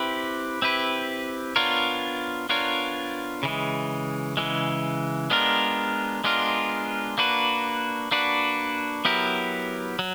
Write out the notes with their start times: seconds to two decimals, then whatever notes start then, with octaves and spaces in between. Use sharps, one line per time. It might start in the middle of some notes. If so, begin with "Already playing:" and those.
Already playing: C4 E4 G4 B4
0.62 C4 E4 G4 B4
1.56 B3 D4 F4 A#4 C#5
2.49 B3 D4 F4 A#4 C#5
3.43 C#3 E3 G#3
4.37 C#3 E3 G#3
5.30 G#3 B3 D4 F4 A#4
6.24 G#3 B3 D4 F4 A#4
7.18 A#3 D4 F#4 B4
8.11 A#3 D4 F#4 B4
9.05 F#3 B3 E4 G4 A#4
9.99 F#3